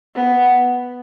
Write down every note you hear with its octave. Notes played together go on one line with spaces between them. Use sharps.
B3